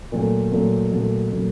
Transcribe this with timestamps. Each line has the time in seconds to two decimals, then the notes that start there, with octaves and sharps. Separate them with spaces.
0.12 A#2 F#3 A3
0.52 A#2 F#3 A3
0.91 A#2 F#3 A3
1.31 A#2 F#3 A3